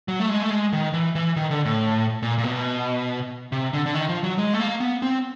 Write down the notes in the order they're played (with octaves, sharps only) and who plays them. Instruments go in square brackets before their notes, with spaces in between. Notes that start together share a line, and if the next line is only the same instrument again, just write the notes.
[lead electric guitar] F#3
A3
G#3
A3
G#3
D#3
E3
E3
D#3
D3
A2
A#2
A#2
B2
C3
D3
D3
D#3
F3
F#3
G#3
A3
A#3
B3
C4